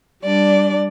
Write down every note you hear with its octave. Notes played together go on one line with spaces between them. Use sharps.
G3 D4 D5